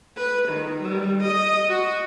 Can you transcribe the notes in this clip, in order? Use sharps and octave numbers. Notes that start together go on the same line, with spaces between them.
B4
D#3
G3
D#5
F#4